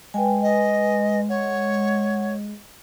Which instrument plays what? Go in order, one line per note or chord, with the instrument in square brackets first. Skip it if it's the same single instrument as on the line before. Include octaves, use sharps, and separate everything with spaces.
[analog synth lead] G#3 [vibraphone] B4 G5 G#5
[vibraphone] B4 G#5 [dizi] D#5
[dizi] C#5 [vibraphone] F#5